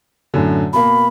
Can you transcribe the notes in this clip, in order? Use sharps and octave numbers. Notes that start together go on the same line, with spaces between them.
F#2 A2 D3
B2 A#3 B5